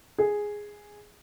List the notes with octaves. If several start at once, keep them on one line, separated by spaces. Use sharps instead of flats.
G#4